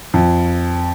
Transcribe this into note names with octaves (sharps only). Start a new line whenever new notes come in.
F2